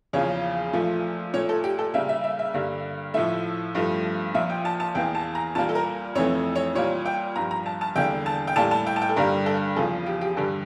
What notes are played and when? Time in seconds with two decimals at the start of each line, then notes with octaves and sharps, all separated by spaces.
0.13 E2 C#3 F3 A#3 C#5
0.73 A#2 F3 A3
1.34 A#2 A3 C#5
1.49 A4
1.64 G4
1.79 A4
1.94 C#3 G3 A#3 E5
2.09 E5
2.24 E5
2.39 E5
2.54 G2 D3 G3 A#3
3.14 A2 F3 A3 E5
3.75 G2 F3 A3
4.34 A#2 F3 A#3 E5
4.50 G5
4.65 A5
4.80 A5
4.95 E2 E3 A#3 G5
5.15 A5
5.35 A#5
5.55 A#2 G3 A#3 A5
5.69 A4
5.75 A#4
6.15 F2 E3 A3 C#5
6.55 C#5
6.75 A#2 G3 A#3 C#5
7.06 G5
7.36 G2 F3 A#3 A#5
7.51 A#5
7.66 A5
7.81 A5
7.96 E2 D3 G3 A#3 G5
8.26 A5
8.47 G5
8.56 A2 G3 A#3 A5
8.71 A5
8.87 G5
8.96 A5
9.01 G5
9.09 A4
9.16 G2 D3 G3 A#3 A#4
9.46 A4
9.76 E2 C#3 F3 A4
10.06 G4
10.21 G4
10.37 G2 D3 G3 A4